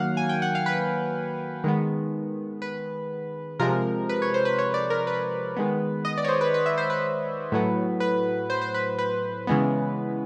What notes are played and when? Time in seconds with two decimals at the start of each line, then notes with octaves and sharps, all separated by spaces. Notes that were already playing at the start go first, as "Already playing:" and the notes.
Already playing: D#3 F#3 A#3 F5 F#5
0.17 G#5
0.29 G5
0.42 F#5
0.55 F5
0.66 B4
1.64 D#3 G#3 B3
2.62 B4
3.59 C3 F3 G#3 A#4
4.09 B4
4.22 C#5
4.34 C5
4.45 B4
4.59 C#5
4.74 D5
4.90 A#4
5.07 B4
5.56 D#3 G#3 B3
6.05 D#5
6.18 D5
6.24 C#5
6.29 C5
6.41 B4
6.54 B4
6.66 E5
6.78 C5
6.90 B4
7.52 A2 F#3 B3
8.00 B4
8.50 C5
8.62 C5
8.74 B4
8.98 B4
9.47 C#3 E3 G#3 B3